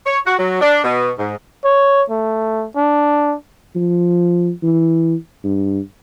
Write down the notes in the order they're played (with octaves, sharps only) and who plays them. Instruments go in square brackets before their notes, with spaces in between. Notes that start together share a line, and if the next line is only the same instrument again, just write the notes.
[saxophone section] C#5
F#4
F#3
D4
B2
G#2
[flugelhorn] C#5
A3
D4
[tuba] F3
E3
G2